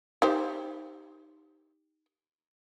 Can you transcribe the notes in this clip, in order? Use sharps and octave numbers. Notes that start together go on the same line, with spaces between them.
D#4 G4 C5